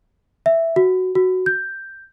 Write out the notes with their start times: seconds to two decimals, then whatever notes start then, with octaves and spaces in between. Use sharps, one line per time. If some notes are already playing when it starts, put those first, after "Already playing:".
0.46 E5
0.76 F#4
1.15 F#4
1.46 G6